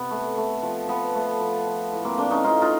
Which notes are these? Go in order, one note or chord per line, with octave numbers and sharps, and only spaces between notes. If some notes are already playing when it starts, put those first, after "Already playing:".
Already playing: C3 B3
A3
A3
F3
F3 B3
A3
F3
F3
A2
A#3 C4
A2 C4 D4
C#4 D#4
A2 D#4 F4
D#4 F4